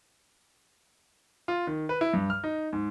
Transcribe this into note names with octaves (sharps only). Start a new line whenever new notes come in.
F4
D#3
B4
E4
G2
F6
D#4
G#2